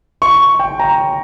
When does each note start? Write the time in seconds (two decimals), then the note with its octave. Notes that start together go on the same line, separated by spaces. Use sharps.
0.22 C#6
0.59 G5
0.80 A#5